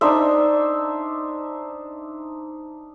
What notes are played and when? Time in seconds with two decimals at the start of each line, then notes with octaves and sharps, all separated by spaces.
0.01 D4 D#4 C5 E5